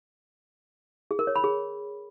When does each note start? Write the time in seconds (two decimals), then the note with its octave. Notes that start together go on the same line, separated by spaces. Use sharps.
1.11 G#4
1.19 A#4
1.27 C#5
1.36 B5
1.44 G#4